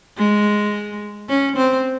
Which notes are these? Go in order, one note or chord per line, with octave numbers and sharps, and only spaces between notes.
G#3
C#4
C4